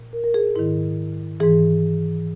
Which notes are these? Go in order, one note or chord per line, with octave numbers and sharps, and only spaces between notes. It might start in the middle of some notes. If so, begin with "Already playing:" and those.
Already playing: A#2
A#4
A#4
G#4
G#2 D#3 E4
G#2 E3 G#4